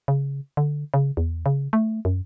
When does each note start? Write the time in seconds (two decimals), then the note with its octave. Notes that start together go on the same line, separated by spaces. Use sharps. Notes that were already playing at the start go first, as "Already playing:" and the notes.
0.08 C#3
0.57 D3
0.94 C#3
1.17 E2
1.46 C#3
1.73 A3
2.05 F#2